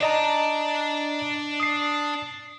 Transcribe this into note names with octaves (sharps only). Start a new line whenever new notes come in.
D4 D5 D#5 A5 A#5
D#6 C7